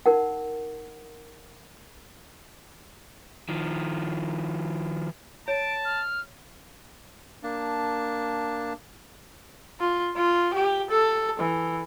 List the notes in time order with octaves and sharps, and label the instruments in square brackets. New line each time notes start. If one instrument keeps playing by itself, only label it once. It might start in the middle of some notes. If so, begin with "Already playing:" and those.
[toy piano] D#4 A#4 F#5
[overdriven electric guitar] D#3 F3
[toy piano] C#5 [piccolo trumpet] A5 [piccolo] D7
[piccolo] F6
[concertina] A#3 D4 A5
[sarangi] F4
F4
G4
A4
E3